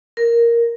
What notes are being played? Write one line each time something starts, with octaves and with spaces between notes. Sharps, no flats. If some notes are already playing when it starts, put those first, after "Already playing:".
A#4